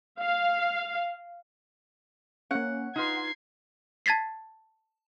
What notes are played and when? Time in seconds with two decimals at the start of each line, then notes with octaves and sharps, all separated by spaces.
0.21 F5
2.51 A#3 C#4 F#5
2.96 D#4 F4 B4 C6 G#6 C7
4.06 A5 G#6 A6 B6 C7